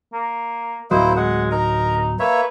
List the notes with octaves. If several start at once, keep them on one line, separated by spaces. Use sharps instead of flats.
A#3
D1 F#3 A#3 E4 C5 D#5
G#3 F#5
D#4 A#4 A#5
A#3 B4 C#5 E5